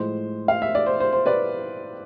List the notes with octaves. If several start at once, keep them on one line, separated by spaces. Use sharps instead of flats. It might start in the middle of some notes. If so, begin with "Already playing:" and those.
Already playing: A2 F3 G#3 C5
F5
E5
D5
C5
C5
C5
B4 D5